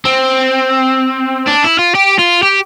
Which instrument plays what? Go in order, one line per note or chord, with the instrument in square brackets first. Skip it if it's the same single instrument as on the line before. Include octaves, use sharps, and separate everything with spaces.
[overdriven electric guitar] C4
D4
E4
F4
G4
F4
G4